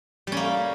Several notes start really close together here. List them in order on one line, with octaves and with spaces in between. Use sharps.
G3 C#4 A#3